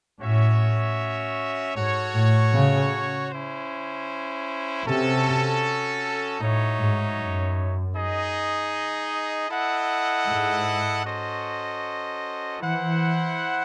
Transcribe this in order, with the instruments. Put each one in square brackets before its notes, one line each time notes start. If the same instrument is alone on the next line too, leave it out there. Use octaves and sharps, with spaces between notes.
[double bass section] A2 [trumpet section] C#4 F#4 C#5 E5
[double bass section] G#2 [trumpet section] F#4 A4 C#5
[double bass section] A2
C#3
[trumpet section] C#4 E4 C5
[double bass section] C3 [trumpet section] C#4 F#4 A4
[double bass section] A2 [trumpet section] D#4 F#4 C#5 E5
[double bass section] G#2
F#2
[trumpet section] D#4 G#4 D#5
E4 A4 D#5 F#5
[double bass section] G#2
[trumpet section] C#4 F#4 A4 C5 D#5
[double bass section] E3 [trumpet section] E4 C5 F#5